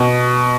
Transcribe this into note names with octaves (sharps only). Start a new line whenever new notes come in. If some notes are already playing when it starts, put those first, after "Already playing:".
Already playing: B2